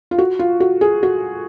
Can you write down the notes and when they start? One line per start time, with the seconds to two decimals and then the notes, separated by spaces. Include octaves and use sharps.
0.11 F4
0.18 F#4
0.39 F4
0.60 F#4
0.81 G#4
1.03 F#4